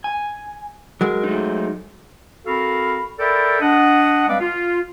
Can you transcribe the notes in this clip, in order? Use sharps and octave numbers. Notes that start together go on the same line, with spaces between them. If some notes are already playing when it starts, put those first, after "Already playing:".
G#5
F#3 G#3 A#4
A3 D#4
C4 F#4 A4 A#4 F5 B5
A4 A#4 D5 E5 G5 B5
D4 D#5 F#5
G3 G#3 C4 B4 D5 F5
F4